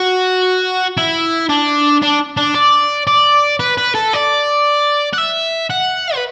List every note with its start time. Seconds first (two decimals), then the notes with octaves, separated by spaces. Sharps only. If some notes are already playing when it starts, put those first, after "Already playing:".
Already playing: F#4
0.97 E4
1.49 D4
2.02 D4
2.37 D4
2.55 D5
3.07 D5
3.60 B4
3.78 B4
3.95 A4
4.13 D5
5.13 F#5
5.18 E5
5.71 F#5
6.15 B4